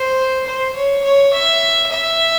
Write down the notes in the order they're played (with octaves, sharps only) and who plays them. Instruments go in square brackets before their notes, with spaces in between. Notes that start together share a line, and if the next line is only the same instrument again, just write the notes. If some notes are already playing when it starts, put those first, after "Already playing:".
Already playing: [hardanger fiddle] C5
C5
C#5
C#5
E5
E5